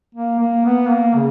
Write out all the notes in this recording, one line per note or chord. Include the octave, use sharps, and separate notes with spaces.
A#3
A#3
B3
A#3
C#3